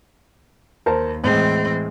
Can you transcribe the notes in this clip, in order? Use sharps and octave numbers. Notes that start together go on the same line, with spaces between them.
D#2 A#4 C5 A5
A2 E3 G#3 C4